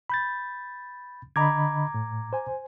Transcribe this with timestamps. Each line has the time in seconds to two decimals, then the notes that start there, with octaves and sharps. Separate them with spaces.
0.10 B5 G6 A6
1.36 D3 D#5 A#5 B5 D6 G#6
1.94 A2
2.33 C5 G#5